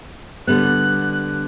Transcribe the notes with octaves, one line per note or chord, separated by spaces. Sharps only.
D3 G3 B3 F#6